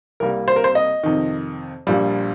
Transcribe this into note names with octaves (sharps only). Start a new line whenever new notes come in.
C2 C3 G3 A#3 A#4
C5
A#4
C5
D#5
F2 C3 D#3
A#1 A#2 G3